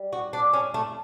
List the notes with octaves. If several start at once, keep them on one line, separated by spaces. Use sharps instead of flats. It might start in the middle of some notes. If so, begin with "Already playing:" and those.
Already playing: G3
F#4
D4
C#4
A3